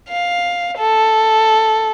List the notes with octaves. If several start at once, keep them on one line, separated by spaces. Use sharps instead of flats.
F5
A4